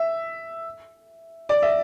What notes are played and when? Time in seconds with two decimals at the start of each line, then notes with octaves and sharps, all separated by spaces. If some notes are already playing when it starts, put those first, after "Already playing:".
Already playing: E5
1.49 D5
1.62 E5